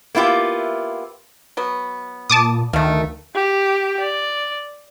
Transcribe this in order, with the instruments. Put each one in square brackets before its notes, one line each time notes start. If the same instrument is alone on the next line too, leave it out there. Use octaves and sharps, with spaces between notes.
[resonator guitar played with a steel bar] A#3 B3 E4 F4 G4
[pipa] F#3 B3
[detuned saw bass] A#2 [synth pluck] A5 D6 D#6
[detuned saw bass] D2 [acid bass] D#3 [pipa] A3 F5
[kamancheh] G4 G5
D5